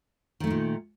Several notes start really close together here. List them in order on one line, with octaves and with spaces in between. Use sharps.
D#3 A3 D#4 A#2